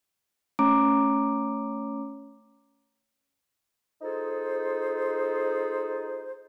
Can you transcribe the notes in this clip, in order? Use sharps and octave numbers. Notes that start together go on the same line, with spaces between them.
A3 C#4 C#5 A#5 D6 D7
D#4 F4 G#4 A4 C5